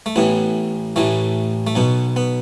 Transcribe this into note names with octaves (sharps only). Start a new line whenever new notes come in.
A3
A1 A2 E3 B3
A1 A2 E3 A3
A3
B1 B2 B3
B3